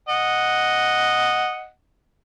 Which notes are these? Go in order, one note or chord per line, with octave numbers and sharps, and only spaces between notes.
D#5 F#5